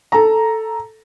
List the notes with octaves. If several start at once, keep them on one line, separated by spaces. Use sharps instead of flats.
A4 A#5